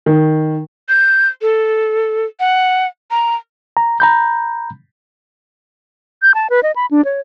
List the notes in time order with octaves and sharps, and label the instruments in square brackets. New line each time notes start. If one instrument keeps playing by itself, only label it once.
[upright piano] D#3
[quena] G6
A4
F#5
A#5
[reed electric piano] A#5
A#5 B5 G6
[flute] G6
A5
B4
D#5
B5
D4
C#5